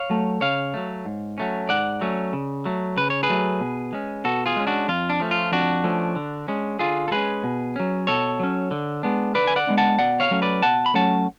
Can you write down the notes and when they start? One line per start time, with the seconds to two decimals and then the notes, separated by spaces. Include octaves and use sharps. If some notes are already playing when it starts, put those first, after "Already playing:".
Already playing: C#5 F5
0.10 F#3 A3
0.41 C#3 C#5 F5
0.74 F#3 A3
1.05 G#2
1.38 F#3 A3 C#4
1.69 G#2 D5 F#5
2.01 F#3 A3 C#4
2.33 C#3
2.66 F#3 A3
2.97 C#3 B4
3.10 C#5
3.23 G#4 B4
3.29 F#3 A3
3.61 B2
3.93 G#3 C#4
4.24 B2 F#4 A4
4.46 F4 G#4
4.56 G#3 C#4
4.67 D4 F#4
4.88 F2 F4
5.10 D4
5.20 F3 A3 C#4
5.31 F4
5.52 F2 D4 F#4
5.84 F3 A3 C#4
6.16 D3
6.48 G#3 C#4
6.79 D3 F4 G#4
7.08 A4
7.11 G#3 C#4 G#4 B4
7.44 B2
7.76 F#3 C#4
8.07 B2 A4 C#5
8.39 F#3 C#4
8.71 D3
9.03 G#3 B3 D4
9.35 D3 B4 D5
9.47 G#5
9.56 D5 F#5
9.67 G#3 B3 D4
9.78 F#5 A5
9.99 B2 D5 F#5
10.20 C#5 F5
10.31 F#3 A3 C#4
10.42 B4 D5
10.62 B2 F#5 A5
10.86 B5
10.94 F#3 A3 C#4 F#5 A5